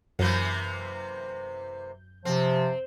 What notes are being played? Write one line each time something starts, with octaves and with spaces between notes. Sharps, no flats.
F#2 C3 E3 A#3 G6
C3 F3 C4